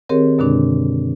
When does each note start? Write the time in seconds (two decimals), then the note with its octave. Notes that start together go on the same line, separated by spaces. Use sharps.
0.09 D#3 C4 G4 G#4 A#4 C#5
0.38 F#2 B2 D3 G#3 D4